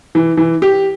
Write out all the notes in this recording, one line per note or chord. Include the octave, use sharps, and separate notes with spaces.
E3
E3
G4